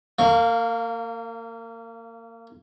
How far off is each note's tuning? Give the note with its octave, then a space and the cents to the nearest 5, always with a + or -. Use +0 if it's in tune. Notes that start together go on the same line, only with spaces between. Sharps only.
A#3 -30 F5 +0 C#6 +0